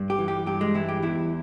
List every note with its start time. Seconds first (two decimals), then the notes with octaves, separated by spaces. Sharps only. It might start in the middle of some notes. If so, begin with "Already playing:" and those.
Already playing: G2
0.10 G4
0.19 E3
0.28 G4
0.46 G2 G4
0.61 G#3
0.75 E3 E4
0.89 G4
1.02 E2 E4